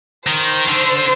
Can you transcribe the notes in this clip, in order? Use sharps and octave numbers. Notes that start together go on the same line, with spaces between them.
D#3 C5
D3